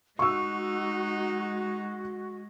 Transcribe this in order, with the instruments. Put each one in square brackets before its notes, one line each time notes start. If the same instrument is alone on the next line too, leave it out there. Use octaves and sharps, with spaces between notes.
[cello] G#3 [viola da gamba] D#4 [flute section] F#4 [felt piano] C#6 E6